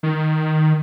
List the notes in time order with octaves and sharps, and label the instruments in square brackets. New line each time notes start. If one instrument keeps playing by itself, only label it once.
[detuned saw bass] D#3